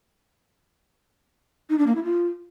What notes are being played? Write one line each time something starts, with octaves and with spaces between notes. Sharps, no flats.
D#4
D4
A#3
E4
F4